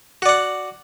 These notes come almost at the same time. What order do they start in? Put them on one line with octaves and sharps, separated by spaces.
F#4 D5 F#5